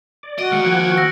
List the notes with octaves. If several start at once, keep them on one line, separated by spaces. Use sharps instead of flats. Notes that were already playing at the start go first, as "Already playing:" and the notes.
D5
F#4 D#5 D7
D#2 G#3 F6 C#7
F3 G5 G#6
F#4
E6 A#6